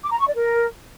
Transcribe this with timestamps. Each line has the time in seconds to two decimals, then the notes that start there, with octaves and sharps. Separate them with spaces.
0.04 D6
0.12 A#5
0.19 C#6
0.27 D5
0.35 A#4